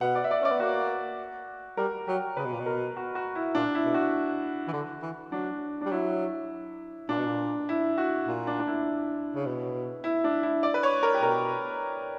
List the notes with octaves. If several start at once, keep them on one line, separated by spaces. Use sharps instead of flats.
B2 F#5
D5
E5
D5
C#4 D5
B3
A#3 F#4
G3 A#4
F#3 G4
C#3 B4
B2
A#2
B2
A#4
F#4
F#4
E4
A#2 D4
E4
B2
F#4
E3
D3
E3
F#3 D4
G3 D4
F#3 E4
A#2 D4
B2
A#2
E4
F#4
A#2
D4
D4
E4
C#3
B2
E4
D4
E4
D5
B4
C#5
A#4
G4
B2 A#4